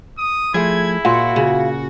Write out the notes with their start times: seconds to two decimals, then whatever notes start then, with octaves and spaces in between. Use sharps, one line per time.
0.18 D#6
0.54 F3 A3 E4 G#4 G#6
1.05 A#2 F4 F#4
1.36 C#3